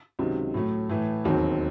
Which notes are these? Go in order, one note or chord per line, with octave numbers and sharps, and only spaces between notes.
C#2 C3 D#3 F#3
A2 F#3 A3
A2 E3 A3
E1 D#2 D#3 F#3 C4